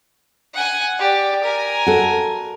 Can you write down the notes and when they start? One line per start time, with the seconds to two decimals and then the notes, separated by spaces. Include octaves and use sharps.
0.54 F#5 G#5
0.99 G4 D5
1.43 A#4 G#5
1.86 F#4 A4